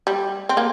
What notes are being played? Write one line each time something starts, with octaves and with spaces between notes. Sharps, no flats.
G3
C4
A#3